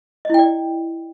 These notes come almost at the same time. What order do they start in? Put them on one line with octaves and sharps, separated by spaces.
D#5 E4 G5 D5